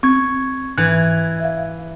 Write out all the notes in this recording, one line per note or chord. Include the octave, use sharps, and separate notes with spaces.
C4 C#6 G#6
G#2 E3 F#6 G#6
E5 F5